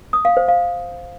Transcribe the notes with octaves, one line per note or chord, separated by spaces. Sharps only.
D#6
F5
C5
F5